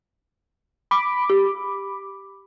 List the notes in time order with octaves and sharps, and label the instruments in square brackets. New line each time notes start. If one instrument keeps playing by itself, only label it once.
[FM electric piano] B5 D6
[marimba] G4